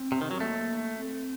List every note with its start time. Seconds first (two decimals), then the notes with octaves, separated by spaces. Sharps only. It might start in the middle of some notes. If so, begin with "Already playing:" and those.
Already playing: C4
0.12 C3
0.21 D#3
0.31 F#3
0.40 A3 A#3
0.97 C4